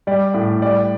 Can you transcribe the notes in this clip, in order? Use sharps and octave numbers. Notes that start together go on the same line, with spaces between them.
G3 D5
A2
G3 D5